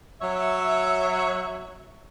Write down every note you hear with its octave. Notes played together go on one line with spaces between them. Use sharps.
F#3 C#5 E5